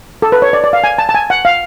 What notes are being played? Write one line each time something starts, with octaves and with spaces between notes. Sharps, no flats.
A4
B4
C#5
D5
D5
F5
G#5
A5
A5
G#5
F#5
F5